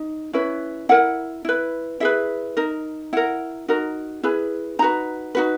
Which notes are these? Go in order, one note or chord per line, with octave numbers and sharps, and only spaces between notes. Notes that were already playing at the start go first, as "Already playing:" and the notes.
Already playing: D#4
C#4 E4 B4
E4 A#4 F#5
E4 B4
E4 G#4 B4 E5
D#4 A#4
E4 A#4 F#5
D#4 F#4 A#4
E4 G#4 B4
D#4 F#4 B4 A#5
D#4 F#4 B4